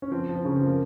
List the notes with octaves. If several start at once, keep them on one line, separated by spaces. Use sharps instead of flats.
C#4
F3 C4
F3
C4
C#3 C#4
C4
F3
A#3